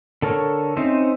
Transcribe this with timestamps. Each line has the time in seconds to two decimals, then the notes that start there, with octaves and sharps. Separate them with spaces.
0.22 D3 A4 A#4 C#5
0.77 C4 C#4 D#4 C5 E5